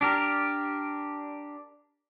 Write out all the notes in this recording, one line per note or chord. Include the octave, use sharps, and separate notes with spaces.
D4 G4 A#4